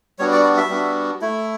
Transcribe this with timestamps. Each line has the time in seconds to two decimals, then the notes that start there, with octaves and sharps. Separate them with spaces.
0.19 G3 B3 D4 F#4 C#5
0.32 D5
0.44 D5
0.57 E5
0.69 G3 B3 D4 F#4
1.21 A3 E4